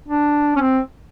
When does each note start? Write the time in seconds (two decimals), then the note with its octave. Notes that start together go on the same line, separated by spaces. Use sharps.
0.08 D4
0.56 C#4
0.60 C4